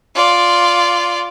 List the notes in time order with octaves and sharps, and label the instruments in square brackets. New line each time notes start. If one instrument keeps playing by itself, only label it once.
[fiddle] F4 D5